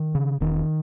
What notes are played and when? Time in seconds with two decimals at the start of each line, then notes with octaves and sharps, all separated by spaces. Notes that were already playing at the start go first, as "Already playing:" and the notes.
Already playing: D#3
0.15 C#3
0.41 E1 D#3